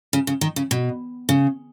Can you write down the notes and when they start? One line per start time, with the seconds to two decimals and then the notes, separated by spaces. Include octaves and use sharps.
0.13 C#3
0.27 C#3
0.41 D#3
0.56 C#3
0.71 B2
1.29 C#3